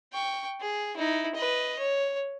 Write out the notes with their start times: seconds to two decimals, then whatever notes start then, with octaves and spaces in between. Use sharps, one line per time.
0.12 G5 C#6
0.61 G#4
0.97 D#4 E4
1.35 B4 D#5
1.79 C#5